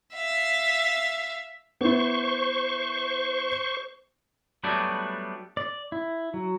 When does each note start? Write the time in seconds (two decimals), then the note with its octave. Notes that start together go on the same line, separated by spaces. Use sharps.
0.14 E5 F5
1.81 B3 E4 C5 C#6
4.64 F#3 G3 A3 B3 D4 F#4
5.57 D5
5.92 E4
6.34 F#3